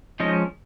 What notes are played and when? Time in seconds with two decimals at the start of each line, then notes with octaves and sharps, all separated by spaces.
0.20 F3 G#3 C#4 D#4 D#5